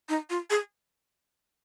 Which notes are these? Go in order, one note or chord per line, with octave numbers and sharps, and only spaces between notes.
D#4
F4
G#4